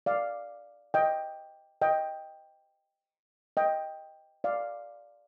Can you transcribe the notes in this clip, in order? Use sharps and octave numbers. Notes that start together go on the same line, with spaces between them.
D5 F5
D#5 G5
D#5 G5
D#5 G5
D5 F5